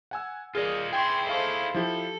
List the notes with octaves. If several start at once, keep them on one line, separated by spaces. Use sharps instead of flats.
F#5 G#5 E6
F4 G#4 A#4 D5 D#5
E4 G#4 G5 C6 C#6
A4 C5 D#5 F5 C#6
F3 E4 G4 A4